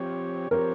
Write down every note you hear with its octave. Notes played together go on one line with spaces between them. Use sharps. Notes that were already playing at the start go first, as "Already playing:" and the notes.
Already playing: F3 C4 G4 C#5
F3 C4 G4 A#4 C#5